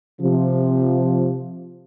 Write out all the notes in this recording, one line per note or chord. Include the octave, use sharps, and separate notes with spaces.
C3 F3